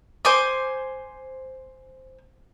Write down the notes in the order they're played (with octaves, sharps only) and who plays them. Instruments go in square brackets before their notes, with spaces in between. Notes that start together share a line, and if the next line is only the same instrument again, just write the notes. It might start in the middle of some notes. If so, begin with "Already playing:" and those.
[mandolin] C5 G#5 D6